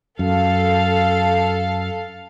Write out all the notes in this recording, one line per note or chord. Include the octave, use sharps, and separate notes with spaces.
F#2 A4 F5